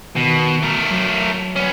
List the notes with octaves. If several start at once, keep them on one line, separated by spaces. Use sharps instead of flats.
B2 D#3
A3 A#4
F#3
B3 C#4